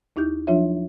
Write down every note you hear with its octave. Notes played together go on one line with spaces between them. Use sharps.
D#2 D#4 E4 G4 G6
F3 F#3 D4 F4 C#5 E5